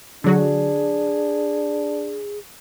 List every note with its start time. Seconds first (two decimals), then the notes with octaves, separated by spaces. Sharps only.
0.24 D3 F#3 D4 F#4 G#4